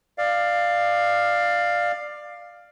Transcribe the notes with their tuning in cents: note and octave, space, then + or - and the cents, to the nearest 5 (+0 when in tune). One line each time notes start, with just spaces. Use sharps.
D5 +20 F5 +0